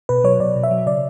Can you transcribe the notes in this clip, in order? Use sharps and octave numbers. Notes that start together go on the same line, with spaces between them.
B2 B4
F#3 C#5
B2 D5
B2
E5
F#3
C#3 D5